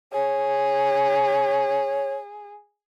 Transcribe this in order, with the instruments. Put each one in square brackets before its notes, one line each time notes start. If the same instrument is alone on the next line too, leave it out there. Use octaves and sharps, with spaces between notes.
[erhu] G#4 [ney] C#5